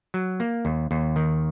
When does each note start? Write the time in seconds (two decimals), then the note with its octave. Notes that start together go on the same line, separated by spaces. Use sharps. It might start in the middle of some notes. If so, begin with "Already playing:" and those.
0.14 F#3
0.40 A#3
0.65 D#2
0.91 D#2
1.16 D#3